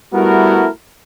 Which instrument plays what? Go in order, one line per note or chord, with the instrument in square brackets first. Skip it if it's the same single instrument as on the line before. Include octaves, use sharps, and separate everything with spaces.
[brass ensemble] G3 A3 B3 E4 F#4 A#4